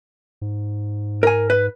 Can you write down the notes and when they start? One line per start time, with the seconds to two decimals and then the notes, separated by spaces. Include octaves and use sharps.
0.42 G#2
1.23 A#4 G#5
1.50 B4